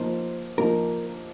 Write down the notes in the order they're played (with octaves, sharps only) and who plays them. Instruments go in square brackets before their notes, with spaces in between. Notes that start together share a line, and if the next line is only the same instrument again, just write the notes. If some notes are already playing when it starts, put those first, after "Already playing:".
Already playing: [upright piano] F3 A#3 D#4 [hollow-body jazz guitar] C5
[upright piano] F3 A#3 D#4 [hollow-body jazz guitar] A#4